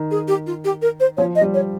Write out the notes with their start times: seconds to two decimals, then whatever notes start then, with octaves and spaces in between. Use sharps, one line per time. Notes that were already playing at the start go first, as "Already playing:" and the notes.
Already playing: D#3
0.11 G#4
0.28 G4
0.47 F4
0.65 G4
0.82 A#4
1.00 C5
1.17 F3 C#5
1.35 D#5
1.41 G3
1.54 C#5